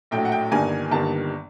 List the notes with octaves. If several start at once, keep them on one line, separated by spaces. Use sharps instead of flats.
A#1 A2 F#3 G5
F#5
G5
G1 G2 D#3 G3 A#3 G#5
G1 G2 D#3 G3 A#3 A5